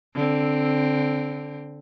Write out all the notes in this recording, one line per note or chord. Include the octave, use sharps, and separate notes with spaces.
D3 C4